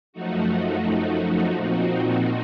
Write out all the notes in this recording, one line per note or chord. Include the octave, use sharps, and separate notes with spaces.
F#2 F3 A3 D#4 F#4
A#2 F3 C4 D#4 F#4